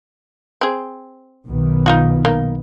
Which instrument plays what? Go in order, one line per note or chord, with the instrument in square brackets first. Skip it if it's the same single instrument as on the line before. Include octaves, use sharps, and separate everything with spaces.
[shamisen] C4 G#4
[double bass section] B1 D#3 B3
[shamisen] D#4 F4 F#4
A#3 D#4